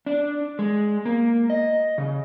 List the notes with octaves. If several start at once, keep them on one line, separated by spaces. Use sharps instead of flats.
D4
G#3
A#3
D#5
C#3